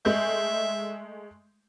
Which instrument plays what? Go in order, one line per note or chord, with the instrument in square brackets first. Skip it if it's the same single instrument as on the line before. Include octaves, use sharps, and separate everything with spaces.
[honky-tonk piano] G#3 A3 G6 [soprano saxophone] E5